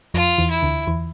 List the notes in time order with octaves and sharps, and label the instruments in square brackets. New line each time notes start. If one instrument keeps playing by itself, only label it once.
[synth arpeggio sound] F2 F3 [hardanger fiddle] F4
[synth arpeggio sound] E2 E3
[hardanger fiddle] E4
[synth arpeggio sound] D2 D3
E2 E3